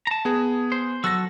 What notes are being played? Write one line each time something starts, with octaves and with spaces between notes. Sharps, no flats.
A5 A#5
B3 G#4
C5
F#3 F#4 A4 E6 A#6